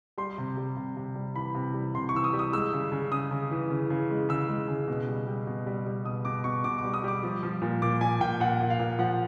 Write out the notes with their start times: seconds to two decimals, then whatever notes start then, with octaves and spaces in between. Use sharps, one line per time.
0.18 G3 C6
0.38 C3
0.57 G3
0.77 C3
0.97 C3
1.15 G3
1.35 E3 B5
1.55 C3
1.74 G3
1.95 C3 C6
2.09 C#6
2.14 E3 E6
2.24 D#6
2.33 G3
2.39 D#6
2.53 G#3 E6
2.73 C#3
2.92 C#3
3.11 C#3 D#6
3.31 C#3
3.51 E3
3.70 C#3
3.90 C#3
4.10 G#3
4.29 C#3 E6
4.49 G#3
4.68 C#3
4.88 B2
5.08 G3
5.27 G3
5.47 B2
5.67 G3
5.87 G3
6.05 B2 D#6
6.25 B2 D6
6.44 B2 C#6
6.64 B2 D6
6.78 D6
6.84 G3
6.94 D#6
7.04 G3 D6
7.23 F3
7.43 F3
7.62 A#2
7.82 A#2 D6
8.01 A#2 G#5
8.20 A#2 G5
8.40 A#2 F#5
8.61 A#2
8.70 F5
8.79 A#2
8.99 F3 F#5